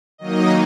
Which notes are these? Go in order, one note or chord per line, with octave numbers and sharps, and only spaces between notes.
D#3 F#3 A#3 D#4 D#5